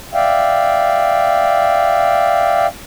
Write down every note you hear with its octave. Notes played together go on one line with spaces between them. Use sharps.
D5 E5 F5 G5